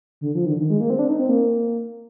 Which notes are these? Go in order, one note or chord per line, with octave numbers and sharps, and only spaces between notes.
D3
F3
D#3
D3
D#3
G#3
A#3
C4
D4
D#4
C4
A#3